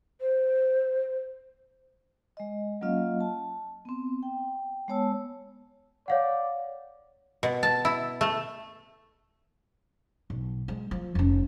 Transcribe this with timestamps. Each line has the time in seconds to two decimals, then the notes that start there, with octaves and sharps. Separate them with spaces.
0.21 C5
2.37 G#3 D#5
2.81 F#3 A#3 C#4 F4 D#5 F5
3.21 A5
3.85 B3 C4
4.23 G5
4.88 G#3 B3 C#5 A5 E6
6.08 C#5 D5 F5 F#5
7.43 B2
7.63 A5
7.85 E4
8.21 A3
10.30 B1
10.68 G#3
10.91 F3
11.15 F1 C#4